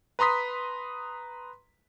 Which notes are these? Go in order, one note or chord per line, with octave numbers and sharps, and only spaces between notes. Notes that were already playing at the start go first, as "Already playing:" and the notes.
B4 A#5 C6 D#6 B6